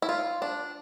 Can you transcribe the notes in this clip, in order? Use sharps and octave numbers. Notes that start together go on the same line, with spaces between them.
E4
F4
D4